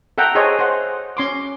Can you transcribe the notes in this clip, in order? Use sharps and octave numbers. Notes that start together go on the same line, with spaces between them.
A4 E5 F#5 G5 A#5
G#4 C5 C#5 D#5
C5 F#5
C#4 C6 D6